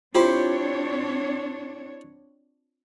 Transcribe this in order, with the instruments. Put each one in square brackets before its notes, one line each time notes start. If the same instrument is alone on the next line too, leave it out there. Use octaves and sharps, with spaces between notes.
[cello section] C4 D4 C#5 [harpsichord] E4 G4 C5 [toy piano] F4